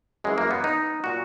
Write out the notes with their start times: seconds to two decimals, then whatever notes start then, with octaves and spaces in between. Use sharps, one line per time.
0.24 F#2 E3 G#3
0.38 A#3
0.51 B3
0.64 D#4
1.04 A#2 F#3 F#4